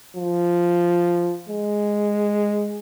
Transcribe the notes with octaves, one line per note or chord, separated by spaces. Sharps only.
F3
G#3